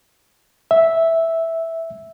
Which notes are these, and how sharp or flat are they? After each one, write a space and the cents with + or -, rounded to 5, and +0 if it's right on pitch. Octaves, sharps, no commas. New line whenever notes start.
E5 -5